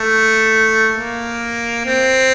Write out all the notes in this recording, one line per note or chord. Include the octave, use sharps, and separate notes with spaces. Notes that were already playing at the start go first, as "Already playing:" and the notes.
Already playing: A3
A#3
C4